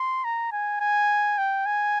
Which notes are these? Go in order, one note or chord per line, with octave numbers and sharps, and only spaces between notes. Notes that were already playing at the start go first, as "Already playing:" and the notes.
Already playing: C6
A#5
G#5
G#5
G5
G#5